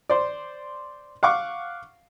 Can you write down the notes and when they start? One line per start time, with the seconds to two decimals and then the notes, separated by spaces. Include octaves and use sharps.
0.10 C5 D5
1.23 F5 F#5 C#6 D6